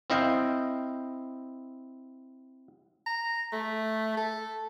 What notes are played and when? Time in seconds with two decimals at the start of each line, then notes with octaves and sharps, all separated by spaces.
0.10 C4 E4 D#5 F5 G5
3.06 A#5
3.53 A3
4.17 A4